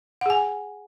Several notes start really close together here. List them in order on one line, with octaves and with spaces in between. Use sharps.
F#5 G#4 G#5